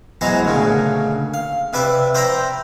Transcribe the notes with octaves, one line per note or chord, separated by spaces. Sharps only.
E3 F#3 G#3 B3 C5 A#5
D2 A#2 C#3
F5
C3 B4 D5 E5 D6
C5 D5 E5 G5 A#5 B5